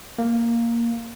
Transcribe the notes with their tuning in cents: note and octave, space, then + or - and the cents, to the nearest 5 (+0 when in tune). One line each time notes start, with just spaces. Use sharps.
A#3 +0